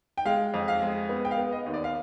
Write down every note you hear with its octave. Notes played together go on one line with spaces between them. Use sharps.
G5
G#3 F5
F2
F5
G#3
B3
G5
F5
B3
D#5
D#2
D5
F5